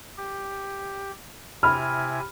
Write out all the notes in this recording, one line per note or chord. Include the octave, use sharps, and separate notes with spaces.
G4
C3 E4 G#5 B5 F6